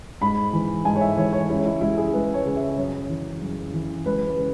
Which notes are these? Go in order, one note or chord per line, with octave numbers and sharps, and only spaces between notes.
G#2 B5
E3
G#2 G#5
C#5
E5
E3 C#5
C#5
C#2 E4
E4
C#2 E4
G#4
C#2 B4
C#5
C#3
E5
F#2 C#5
E3
F#2
E3
C#2 B4
B4
C#3